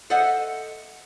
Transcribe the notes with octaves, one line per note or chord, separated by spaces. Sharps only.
A4 C5 D#5 E5 F#5